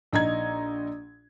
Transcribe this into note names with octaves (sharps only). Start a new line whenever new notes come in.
A#1 D#4 A#5 G#6